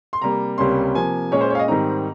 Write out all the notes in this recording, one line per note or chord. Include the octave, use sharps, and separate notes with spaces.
C6
C3 G3 A#3 A#5
C#2 C3 G3 A#3 C#4 C6
C3 F3 A#3 G#5
A#2 G#3 C#4 C#5
C5
C#5
F5
D#5
G#2 D#3 G3 C4 D#4 A#5